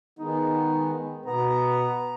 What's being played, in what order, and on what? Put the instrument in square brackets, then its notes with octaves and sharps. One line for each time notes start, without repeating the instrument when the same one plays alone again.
[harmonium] D#3 G#3 B3 [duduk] D#4
[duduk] B2 [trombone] B3 [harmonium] A#5